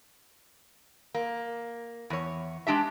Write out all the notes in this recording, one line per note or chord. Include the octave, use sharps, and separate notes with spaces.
A#3
E2 C#5
G#3 D4 G4 E5